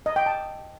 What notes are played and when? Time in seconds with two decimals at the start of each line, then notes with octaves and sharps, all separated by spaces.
0.06 D#5
0.16 G5
0.26 A5